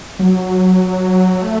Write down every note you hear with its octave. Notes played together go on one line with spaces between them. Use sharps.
F#3
A3